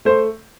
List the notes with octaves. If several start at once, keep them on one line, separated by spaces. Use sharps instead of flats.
A3 C5